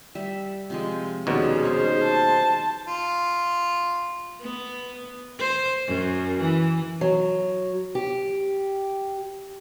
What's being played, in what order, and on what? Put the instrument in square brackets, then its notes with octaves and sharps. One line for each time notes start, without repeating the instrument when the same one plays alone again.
[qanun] G3 E5
C3 F3 G#3
[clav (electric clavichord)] D#2 B2 [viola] C#4 G#4 [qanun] D5
[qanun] D#4 C#6 [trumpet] C5
[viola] A5
[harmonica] F4
[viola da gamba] B3
C5
F#2
E3
[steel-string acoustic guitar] F#3
G4